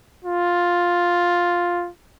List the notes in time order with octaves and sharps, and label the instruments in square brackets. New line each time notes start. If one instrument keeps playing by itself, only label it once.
[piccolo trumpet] F4